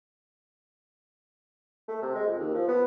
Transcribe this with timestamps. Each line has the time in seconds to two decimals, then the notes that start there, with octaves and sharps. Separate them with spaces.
1.88 A3
2.02 C3
2.15 G#3
2.27 F2
2.39 D#2
2.54 F3
2.68 B3